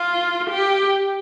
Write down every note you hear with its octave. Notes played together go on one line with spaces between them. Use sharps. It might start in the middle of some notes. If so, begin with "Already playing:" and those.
Already playing: F4
G4